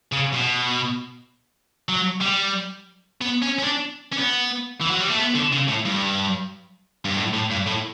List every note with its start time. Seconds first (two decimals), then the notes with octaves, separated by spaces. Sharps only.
0.13 C#3
0.34 B2
1.89 F#3
2.21 G3
3.21 B3
3.42 C#4
3.59 C#4
3.64 D4
4.13 C#4
4.20 B3
4.81 E3
4.90 F#3
5.00 G3
5.10 A3
5.19 B3
5.35 D3
5.52 C#3
5.68 A2
5.85 G2
7.05 G2
7.16 A2
7.33 A2
7.50 G2
7.67 A2